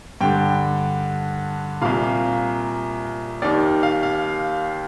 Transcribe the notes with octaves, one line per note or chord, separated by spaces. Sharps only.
G2 D3 G5
C2 A#2 F5
D#2 D#3 D5
F5
F5